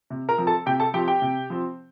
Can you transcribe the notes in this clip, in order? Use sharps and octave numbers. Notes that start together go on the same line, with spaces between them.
C3
A#4 A#5
F3 C4
A4 A5
C3 G4 G5
A4 A5
F3 C4 G4 G5
G4 G5
C3
F3 C4